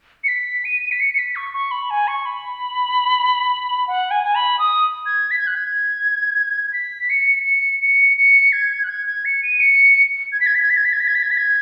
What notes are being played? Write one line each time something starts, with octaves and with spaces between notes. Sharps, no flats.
C#7
B6
D#7
B6
C#7
C#7
B6
C#6
C#6
B5
G#5
C#6
B5
F#5
G#5
G#5
B5
D#6
G#6
B6
G#6
F#6
G#6
B6
C#7
C#7
C#7
C#7
G#6
F#6
G#6
G#6
C#7
D#7
C#7
G#6
B6
G#6
B6
G#6
B6
G#6
B6
G#6
B6
G#6
B6
G#6
B6
G#6